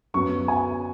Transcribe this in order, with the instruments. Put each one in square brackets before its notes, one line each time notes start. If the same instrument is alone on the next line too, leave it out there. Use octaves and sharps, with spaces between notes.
[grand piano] F#2 F#3 B3 C#6
G#5